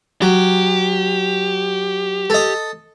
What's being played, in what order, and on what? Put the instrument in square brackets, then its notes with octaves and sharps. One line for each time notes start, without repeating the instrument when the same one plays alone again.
[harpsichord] F#3 [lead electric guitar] G4
[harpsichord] A4 D#5